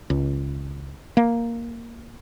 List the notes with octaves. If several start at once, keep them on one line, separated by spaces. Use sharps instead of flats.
C#2
A#3